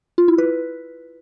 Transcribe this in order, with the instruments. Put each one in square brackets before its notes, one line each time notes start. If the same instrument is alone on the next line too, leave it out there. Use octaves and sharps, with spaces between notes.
[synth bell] F4
E4
B4